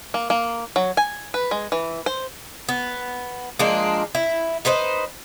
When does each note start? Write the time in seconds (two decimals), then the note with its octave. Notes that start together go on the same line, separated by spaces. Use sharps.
0.14 A#3
0.30 A#3
0.76 F#3
0.97 G#5
1.34 B4
1.51 G#3
1.72 E3
2.06 C5
2.69 B3
3.59 F3 G#3 A#3 D4
4.15 E4
4.65 D#4 B4 C5 D#5